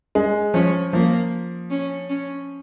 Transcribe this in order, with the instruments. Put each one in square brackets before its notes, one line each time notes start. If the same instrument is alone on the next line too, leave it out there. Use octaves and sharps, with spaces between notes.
[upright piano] G#3
[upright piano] F3 [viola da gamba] C#4
[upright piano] F3 [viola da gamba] A#3
[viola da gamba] C#4
C#4